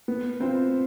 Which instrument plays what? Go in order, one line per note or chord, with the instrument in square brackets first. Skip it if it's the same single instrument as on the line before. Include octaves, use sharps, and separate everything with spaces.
[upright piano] B3
[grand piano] C4 [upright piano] F4 C5